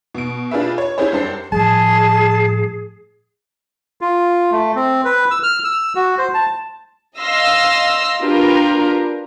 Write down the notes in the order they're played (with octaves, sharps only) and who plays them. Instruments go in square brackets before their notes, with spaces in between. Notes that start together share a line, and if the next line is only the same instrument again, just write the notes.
[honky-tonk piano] B2 D7
D4 F4 G4 G#4 B4 E5
C#5
C#4 E4 G4 G#4 C5 C#5
F#2 G3 D4 C5 A5 C7
[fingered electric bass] A2 F3 G3 [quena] G#4 [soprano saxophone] A5
[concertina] F4
A3
C4
B4
E6
F6
E6
F#4
C5
A5
[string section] D#5 F5 C6 E6 A#6
D4 F4 G4 A#4 B4